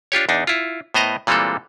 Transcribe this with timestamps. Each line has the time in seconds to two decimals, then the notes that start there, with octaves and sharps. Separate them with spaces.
0.12 D4 F4 G4 C#5
0.29 E2 D4 D#4
0.47 E4 F4
0.94 A2 B3 C5 D#5 A#5
1.27 A#2 E3 G3 G#3 C4 A4